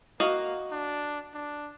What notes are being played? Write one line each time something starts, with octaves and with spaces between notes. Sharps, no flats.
A#3 F#4 D#5 F5
D4
D4